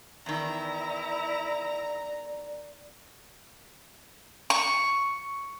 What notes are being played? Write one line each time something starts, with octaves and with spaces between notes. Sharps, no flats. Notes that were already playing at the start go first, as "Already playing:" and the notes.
E2 D#3 E4 D5 A#5
C#6